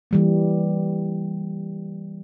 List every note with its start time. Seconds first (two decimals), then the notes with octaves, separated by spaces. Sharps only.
0.11 E3 G3 A#3